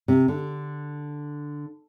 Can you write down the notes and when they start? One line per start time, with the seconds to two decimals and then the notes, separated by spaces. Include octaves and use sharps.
0.08 C3
0.28 D3